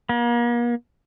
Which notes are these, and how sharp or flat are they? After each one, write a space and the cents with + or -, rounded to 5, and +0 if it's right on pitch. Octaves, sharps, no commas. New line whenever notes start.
A#3 +40